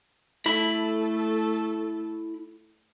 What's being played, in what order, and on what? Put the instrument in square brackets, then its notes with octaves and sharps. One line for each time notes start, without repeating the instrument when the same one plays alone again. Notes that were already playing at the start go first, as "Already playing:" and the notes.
[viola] A3 A4 [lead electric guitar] E4 B5